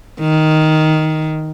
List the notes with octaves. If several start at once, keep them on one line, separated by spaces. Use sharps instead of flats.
D#3